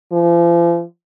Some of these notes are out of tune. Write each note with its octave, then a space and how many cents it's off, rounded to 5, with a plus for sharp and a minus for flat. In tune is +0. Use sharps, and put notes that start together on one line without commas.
F3 -40